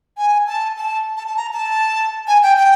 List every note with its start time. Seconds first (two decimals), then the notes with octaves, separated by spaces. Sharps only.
0.17 G#5
0.47 A5
0.77 A5
1.17 A5
1.27 A5
1.37 A#5
1.53 A5
2.28 G#5
2.43 G5
2.57 G5